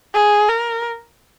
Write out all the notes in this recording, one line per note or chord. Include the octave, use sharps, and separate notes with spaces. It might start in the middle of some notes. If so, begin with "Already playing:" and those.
G#4
A#4